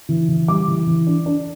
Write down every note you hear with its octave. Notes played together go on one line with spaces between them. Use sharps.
E3
E3
G3 D6
E3
E3
D4
D4